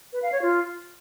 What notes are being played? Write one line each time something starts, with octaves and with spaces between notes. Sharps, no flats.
B4
F5
C#5
F4